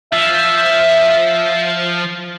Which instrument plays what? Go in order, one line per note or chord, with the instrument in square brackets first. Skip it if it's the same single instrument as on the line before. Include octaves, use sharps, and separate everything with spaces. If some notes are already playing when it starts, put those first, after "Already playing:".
[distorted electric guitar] F3 [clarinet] E5